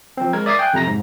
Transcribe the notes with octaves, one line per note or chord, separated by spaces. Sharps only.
F3 C4
G#3 A#4 G#6
D5 E5 D#6 G#6 A6 C7
G5 G#5 F#6
F2 C3 A#5 A#6
G#2